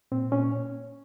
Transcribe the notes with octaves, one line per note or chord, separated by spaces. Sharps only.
A#2 C4
A#2 C#4